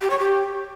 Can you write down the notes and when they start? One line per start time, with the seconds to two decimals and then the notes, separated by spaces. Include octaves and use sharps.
0.01 G4
0.10 C#5
0.19 G4